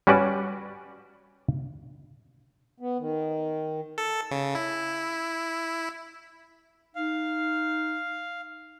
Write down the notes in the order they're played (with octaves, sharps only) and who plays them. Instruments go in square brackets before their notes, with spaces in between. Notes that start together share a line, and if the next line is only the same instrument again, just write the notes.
[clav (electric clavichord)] G3 C#4 F#4 B4 D5
[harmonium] B3
D#3
[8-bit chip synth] A4
C#3
E4
[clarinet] D#4 [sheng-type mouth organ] F5